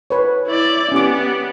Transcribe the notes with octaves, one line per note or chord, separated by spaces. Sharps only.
B4 C#5
E4 D5
B3 C#4 G4 D6